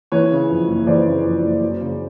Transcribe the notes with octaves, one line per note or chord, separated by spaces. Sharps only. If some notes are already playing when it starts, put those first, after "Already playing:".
E3 B4 C#5
C#3
F2
F#1
E3 C5 D5
C#3
F2
F#1
F#3
C#3